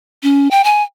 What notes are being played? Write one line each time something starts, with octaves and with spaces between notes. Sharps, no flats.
C#4
G5
G#5